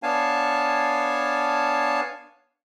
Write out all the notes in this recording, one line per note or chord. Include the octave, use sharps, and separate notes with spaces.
B3 D4 C#5 F5 G#5 A5